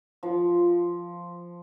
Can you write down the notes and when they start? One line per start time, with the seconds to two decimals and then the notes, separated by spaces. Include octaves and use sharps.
0.23 F3